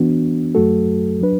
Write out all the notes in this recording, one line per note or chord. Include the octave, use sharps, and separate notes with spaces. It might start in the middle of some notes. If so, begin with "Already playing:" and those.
Already playing: E3 B3 D4 F#4
F#2 F#3 A3 F#4 A4
F#3 D4 B4